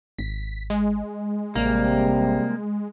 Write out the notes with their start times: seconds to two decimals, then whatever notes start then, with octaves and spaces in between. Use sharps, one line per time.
0.19 G#1 B6
0.70 G#3
1.56 A1 C3 G3 A#3